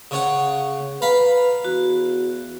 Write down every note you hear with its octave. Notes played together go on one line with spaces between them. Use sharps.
C#3 C#5 F#5
B4 F5 A#5 B5
E2 F#4